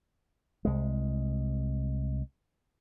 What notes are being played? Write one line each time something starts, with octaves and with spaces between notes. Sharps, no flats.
C2 G#3